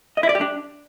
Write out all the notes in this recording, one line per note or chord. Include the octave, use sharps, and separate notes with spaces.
D#5
E4
D5
G4
D4